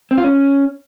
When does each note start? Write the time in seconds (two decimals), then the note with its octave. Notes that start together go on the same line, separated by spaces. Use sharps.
0.11 C4
0.17 F4
0.24 C#4